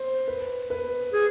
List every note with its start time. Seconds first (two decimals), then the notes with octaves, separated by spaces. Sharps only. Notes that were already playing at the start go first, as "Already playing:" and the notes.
Already playing: C5
0.28 B4
0.70 B4
1.13 G#4